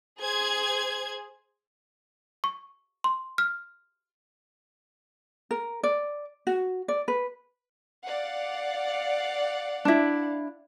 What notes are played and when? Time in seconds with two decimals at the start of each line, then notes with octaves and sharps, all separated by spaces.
0.20 G#4 C5 G#6
2.44 C#6
3.04 C6
3.38 F6
5.51 A#4
5.83 D5
6.47 F#4
6.88 D5
7.08 B4
8.05 D5 F5 F#5
9.85 D4 E4